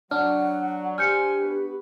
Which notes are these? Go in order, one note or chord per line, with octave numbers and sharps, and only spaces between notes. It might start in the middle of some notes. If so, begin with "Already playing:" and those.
F#3 D4 F#5 F6
G4 C5 G5 G#5 F6 G6 C#7
B3 F#4 B4